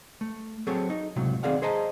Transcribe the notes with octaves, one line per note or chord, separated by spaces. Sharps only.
A3
F#3 C4 G#4 A4 C#5
D#4
C#2 A2 C3 F#3
D#3 C4 G#4 D5 F5 F#5
G#4 C5 D#5 A5 A#5